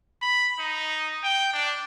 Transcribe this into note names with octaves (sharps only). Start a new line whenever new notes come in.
B5
D#4
G5
D4